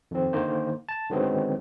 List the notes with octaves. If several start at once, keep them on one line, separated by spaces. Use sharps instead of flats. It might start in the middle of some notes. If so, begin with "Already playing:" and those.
F2 D#3 C4
D3 D#3 A#3 C5
A5
D3 D#3 F#3 G#3 B3 C4